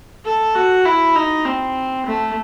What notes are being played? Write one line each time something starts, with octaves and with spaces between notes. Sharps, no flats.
A4
F#4
E4
D#4
C4
A3